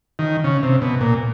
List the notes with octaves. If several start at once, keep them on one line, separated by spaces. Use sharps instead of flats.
D#3
C#3
C3
B2
A#2